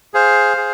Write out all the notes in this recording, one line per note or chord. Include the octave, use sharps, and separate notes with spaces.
G#4 C5 F5
G#4